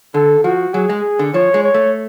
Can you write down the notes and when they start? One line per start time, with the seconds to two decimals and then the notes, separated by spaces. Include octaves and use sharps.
0.14 D3 A4
0.44 F3 F#4
0.74 F#3 G#4
0.89 G#3
1.19 D3
1.34 F3 C#5
1.54 G#3
1.64 C#5
1.74 A3